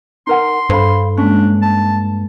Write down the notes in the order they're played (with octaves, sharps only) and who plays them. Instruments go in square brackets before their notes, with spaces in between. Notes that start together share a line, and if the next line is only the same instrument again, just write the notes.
[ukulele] D#4 A#4 F#5 [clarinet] C6
[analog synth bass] G2 [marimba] A4 [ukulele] C5 F5 B5
[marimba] G#3 A#3 [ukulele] C#4 [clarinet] D4
[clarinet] A5